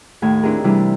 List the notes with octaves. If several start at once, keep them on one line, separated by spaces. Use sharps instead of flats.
D#2 A2 G#5
C4 D4 E4 G4 G#4 A#4
C3 E3 G3 D4 E4